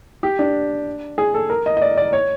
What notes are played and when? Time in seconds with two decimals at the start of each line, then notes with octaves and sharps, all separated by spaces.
0.23 G4
0.39 D4
1.18 G#4
1.34 A4
1.50 A#4
1.66 D#5
1.77 D#5
1.82 D5
1.97 D5
2.13 C#5